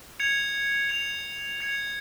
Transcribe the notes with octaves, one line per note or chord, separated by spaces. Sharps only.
G#6 C#7 F7
G#6 C#7 F7
G#6 C#7 F7